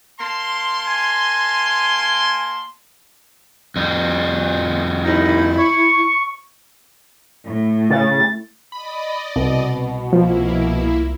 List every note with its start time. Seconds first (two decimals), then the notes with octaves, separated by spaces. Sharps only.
0.19 A#3 A5 C6
0.87 G#5
3.76 F2 G3
5.04 D#2 D#4 E4
5.59 C#6
7.47 A2
7.90 C#3 A6
8.72 D5 D#5 B5
9.36 C2 B2
10.13 F3 A#3 E4